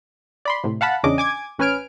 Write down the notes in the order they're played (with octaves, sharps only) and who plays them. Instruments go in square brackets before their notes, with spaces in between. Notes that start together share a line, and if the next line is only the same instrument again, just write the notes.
[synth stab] D5 B5 C6
A2 C3
F5 F#5 A5 B5
E2 C#3 C#4 D4 D#5 D6
G#5 D6 G#6
A1 C#4 B4 G#5 F6 D7